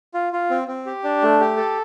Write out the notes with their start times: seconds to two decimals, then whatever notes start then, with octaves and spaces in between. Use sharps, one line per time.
0.14 F4
0.33 F4
0.50 C4
0.68 C4
0.86 G4
1.04 D4
1.22 A3
1.40 G4
1.57 A4